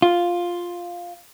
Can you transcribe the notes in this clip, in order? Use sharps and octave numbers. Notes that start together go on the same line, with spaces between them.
F4